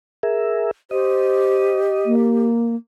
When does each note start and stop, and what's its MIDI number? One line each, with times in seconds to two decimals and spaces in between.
0.23 0.71 68
0.23 0.71 70
0.23 0.71 76
0.91 2.46 67
0.91 1.78 72
0.91 2.15 75
2.06 2.75 58